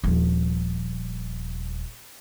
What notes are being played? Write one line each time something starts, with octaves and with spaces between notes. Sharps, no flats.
D#1 F3